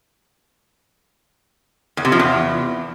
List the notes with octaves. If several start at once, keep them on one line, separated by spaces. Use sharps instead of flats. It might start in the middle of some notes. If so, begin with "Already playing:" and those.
E2
C3
F3
E2